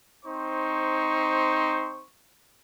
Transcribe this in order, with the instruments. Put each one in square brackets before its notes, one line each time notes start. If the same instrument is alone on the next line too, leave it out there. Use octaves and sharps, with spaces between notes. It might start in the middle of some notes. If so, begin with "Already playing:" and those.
[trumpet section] C4 D#4 C5 C#6